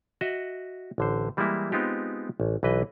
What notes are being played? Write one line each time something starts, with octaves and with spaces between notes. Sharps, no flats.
F#4 D#5 E5 F#5
A1 D3 C5
E3 G3 G#3 A#3 E4
G#3 B3 C4 D#4 F4 G4
A1
B1 E3 B4 D#5